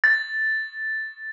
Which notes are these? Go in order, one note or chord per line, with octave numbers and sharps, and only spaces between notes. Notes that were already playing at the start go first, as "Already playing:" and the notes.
A6